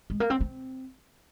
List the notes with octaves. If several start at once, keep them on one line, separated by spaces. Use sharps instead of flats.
G#3
A#3
C4
C4